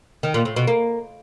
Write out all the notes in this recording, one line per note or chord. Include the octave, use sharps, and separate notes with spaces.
D#3
A#2
A2
B2
A#3